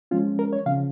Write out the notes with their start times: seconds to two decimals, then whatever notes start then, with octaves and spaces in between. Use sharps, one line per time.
0.11 F3 G#3 C#4 F4
0.39 A#4
0.53 C#5
0.66 C#3 F3 C#4 F5